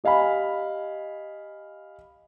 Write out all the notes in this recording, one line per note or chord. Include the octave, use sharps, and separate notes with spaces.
G4 D#5 F5 G#5 B5